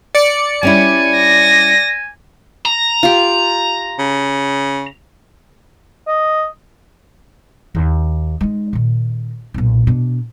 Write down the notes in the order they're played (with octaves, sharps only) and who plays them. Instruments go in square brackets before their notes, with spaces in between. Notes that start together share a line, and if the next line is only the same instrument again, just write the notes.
[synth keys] D5 C#7
[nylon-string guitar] G3 C#4 E4 [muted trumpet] G#5
[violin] A#6
[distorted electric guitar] A#5
[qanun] F4 G4
[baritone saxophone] C#3
[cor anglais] D#5
[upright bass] D#2
G#3 D#4
A#2 D#3
B1 A#2
B2 D4